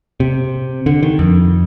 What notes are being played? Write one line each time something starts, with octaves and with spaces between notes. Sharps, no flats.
C3
D3
D#3
F2